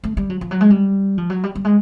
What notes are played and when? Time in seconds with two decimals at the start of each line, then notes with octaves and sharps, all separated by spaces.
0.04 A3
0.17 G3
0.30 F#3
0.41 F3
0.51 F#3
0.61 G#3
0.70 G3
1.18 F3
1.30 F#3
1.43 G3
1.55 G3
1.65 G#3